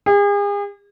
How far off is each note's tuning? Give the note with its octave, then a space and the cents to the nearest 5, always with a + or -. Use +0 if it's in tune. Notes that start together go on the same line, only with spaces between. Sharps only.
G#4 -40